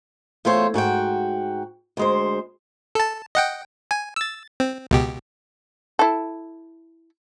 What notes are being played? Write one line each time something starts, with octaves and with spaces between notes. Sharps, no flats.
E2 A3 F4 C5 C#5
G#2 F#4 A#4 G5
D2 G#3 C5
A4 A5
D#5 F#5 G5
G#5
E6 A6
C4
C#2 B2 G4
E4 A4